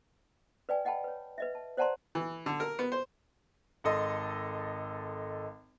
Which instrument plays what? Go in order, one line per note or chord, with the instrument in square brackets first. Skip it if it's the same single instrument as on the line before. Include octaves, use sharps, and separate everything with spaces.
[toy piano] B4 D5 G5 G#5
D#5 F#5 G5 A5 B5
B4 C#5
B4 D#5 E5
A5
C5 D5 F#5 A5 A#5 C6
[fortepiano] E3
D3
A#4
B3
C5
[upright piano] G#1 A4 D#5 C6